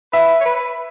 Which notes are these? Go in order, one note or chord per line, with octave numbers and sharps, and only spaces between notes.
B4 E5
C#5
B4